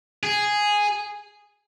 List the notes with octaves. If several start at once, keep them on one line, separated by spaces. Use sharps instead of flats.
G#4